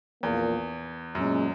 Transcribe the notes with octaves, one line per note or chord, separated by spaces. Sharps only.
A#1 E2 A#2 A#3
F#2 A#2 G#3 C#4